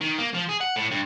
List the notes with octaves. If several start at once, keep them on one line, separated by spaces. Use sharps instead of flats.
D#3
A#3
F3
G#4
F#5
A2
G2